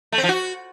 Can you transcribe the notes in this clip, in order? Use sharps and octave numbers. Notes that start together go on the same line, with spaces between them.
A3
C4
F3
F#4